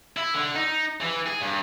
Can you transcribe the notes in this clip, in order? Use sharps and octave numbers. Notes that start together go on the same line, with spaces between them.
E4
D3
D#4
E3
G#4
G2